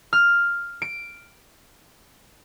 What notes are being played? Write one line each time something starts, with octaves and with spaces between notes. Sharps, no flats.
F6
D7